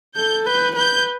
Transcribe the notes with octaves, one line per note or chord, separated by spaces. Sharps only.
A4 G6
B4 G6
B4 G6